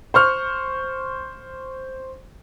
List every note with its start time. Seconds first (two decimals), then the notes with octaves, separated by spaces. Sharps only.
0.14 C5 C#6 F6